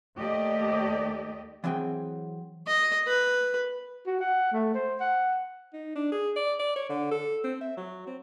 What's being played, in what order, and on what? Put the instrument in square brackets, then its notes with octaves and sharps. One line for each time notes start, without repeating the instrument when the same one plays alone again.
[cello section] D#2 A3 G4 D5 D#5
[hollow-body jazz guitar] E3 F#3 C4 G#4 G5
[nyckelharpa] D#5
B4
[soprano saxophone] F#4
F#5
A3
C5
F#5
[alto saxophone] D#4
D4
G#4
D5
D5
C#5
D3
A4
C4
E5
F#3
C4